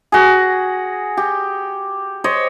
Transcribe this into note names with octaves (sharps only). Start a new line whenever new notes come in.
F#4 G#4
G4
C5 C#5 D#5